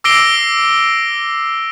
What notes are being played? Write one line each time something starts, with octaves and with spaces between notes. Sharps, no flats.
D6 E6 A#6 C7 D7 G7